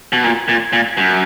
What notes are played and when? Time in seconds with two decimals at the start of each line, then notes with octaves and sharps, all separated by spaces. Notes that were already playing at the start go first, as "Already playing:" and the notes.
0.13 B2
0.24 A#2
0.48 A#2
0.73 A#2
0.97 F#2